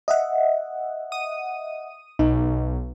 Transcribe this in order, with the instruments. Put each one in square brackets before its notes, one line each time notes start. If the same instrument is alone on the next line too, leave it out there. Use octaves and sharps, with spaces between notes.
[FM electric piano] D#5 E5 F#5
[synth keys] D#6 D#7
[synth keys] B1 [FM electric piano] D#4